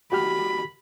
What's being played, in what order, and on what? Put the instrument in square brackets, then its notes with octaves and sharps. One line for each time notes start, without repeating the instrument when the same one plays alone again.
[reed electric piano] F#4 G4 F6 [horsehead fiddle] B5